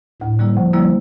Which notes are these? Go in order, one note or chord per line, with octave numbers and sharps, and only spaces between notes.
D2 A2
D3 G3 A#3 E4
D2 F3
D3 G3 A#3 E4